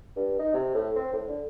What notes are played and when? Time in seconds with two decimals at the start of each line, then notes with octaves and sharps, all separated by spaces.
0.16 G2
0.39 D#4
0.54 C3
0.74 A2
0.96 C4
1.13 A2
1.28 D3